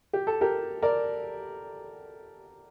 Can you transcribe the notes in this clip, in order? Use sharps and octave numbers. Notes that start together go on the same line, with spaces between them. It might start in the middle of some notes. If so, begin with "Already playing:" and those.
G4
A4
G4 A#4
A#4 D5